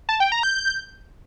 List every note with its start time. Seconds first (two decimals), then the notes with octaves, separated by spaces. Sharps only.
0.09 A5
0.20 G5
0.32 A#5
0.43 G6